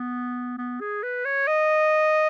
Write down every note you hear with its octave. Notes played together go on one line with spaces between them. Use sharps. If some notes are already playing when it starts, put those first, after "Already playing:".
Already playing: B3
B3
G#4
B4
C#5
D#5